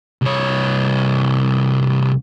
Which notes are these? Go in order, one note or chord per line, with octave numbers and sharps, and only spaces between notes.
C2 C#5